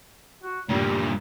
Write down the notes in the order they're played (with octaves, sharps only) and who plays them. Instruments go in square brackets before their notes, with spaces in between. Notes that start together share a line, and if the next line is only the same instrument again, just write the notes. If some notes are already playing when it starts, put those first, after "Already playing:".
[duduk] F#4
[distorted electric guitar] G2 A#2 [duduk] G3